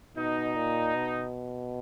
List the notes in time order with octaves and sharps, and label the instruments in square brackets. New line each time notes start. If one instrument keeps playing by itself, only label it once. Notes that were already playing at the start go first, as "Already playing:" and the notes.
[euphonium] B2 [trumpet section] D#4
[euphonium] A#2
B2